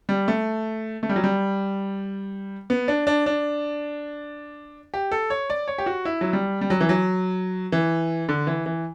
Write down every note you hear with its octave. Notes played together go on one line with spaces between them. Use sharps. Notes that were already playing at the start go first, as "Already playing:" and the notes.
G3
A3
A3
G3
F#3
G3
B3
D4
D4
D4
G4
A4
C#5
D5
C#5
G4
F#4
E4
F#3
G3
G3
F#3
E3
F#3
E3
D3
E3
E3